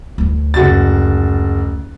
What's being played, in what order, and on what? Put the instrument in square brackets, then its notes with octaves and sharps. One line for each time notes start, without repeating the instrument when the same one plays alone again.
[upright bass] D2 D4
[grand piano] F#1 F#4 A6